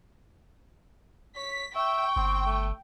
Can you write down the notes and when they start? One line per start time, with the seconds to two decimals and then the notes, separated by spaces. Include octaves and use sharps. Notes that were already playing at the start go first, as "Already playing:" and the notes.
1.36 C#5 B6
1.76 E5 G5 C#6
2.16 G1 C4
2.46 A3